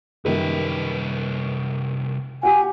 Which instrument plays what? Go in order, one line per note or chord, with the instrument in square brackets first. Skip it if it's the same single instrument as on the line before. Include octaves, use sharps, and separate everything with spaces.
[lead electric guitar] C2 B4 [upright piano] F#2 D#3 G3
[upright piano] F#4 G4 [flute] G#5